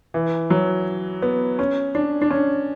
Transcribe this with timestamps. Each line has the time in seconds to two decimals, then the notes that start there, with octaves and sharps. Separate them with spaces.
0.14 E3
0.50 F#3
1.22 B3
1.59 C#4
1.95 D4
2.22 D4
2.31 C#4